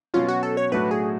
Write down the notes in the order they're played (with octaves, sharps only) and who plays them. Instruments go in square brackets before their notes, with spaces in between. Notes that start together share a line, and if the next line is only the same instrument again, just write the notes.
[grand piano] B2 F#3 C#4 [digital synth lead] F4
[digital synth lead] F#4
A4
C#5
[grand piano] A2 F#3 A3 D4 F#4 [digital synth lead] B4
[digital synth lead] G#4